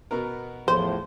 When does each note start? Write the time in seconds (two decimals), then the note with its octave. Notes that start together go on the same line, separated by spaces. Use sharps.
0.11 B2 B3 A#4
0.68 E2 A2 F3 C5